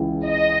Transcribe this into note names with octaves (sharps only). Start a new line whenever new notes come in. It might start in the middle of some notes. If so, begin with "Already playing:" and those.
Already playing: C#2 C#3 E3
D#5